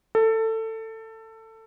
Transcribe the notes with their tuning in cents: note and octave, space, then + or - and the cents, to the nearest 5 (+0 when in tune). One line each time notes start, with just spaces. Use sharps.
A4 +20